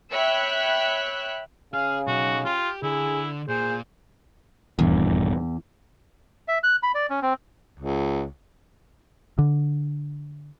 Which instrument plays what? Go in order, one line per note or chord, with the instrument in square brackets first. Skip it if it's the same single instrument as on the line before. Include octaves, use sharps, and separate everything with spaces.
[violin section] C#5 E5 G5 B5 E6 F#6
[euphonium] C#3 [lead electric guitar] G#4 [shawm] F5
[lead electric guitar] B1 D#4 [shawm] F#4
[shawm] F4 [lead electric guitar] G4
[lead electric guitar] D3 [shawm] E4 [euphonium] G#4
[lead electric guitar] A#2 [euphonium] G#4 [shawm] C5
[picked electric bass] D#1 G2 [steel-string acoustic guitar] E2
[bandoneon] E5
F#6
B5
D5
C#4
C4
[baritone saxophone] C#2
[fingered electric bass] D3